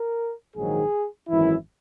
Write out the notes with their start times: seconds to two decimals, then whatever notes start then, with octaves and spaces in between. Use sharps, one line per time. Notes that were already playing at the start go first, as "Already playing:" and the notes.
Already playing: A#4
0.56 A#1 G#2 D#3 F#3 G#4
1.29 G#1 F#2 E3 E4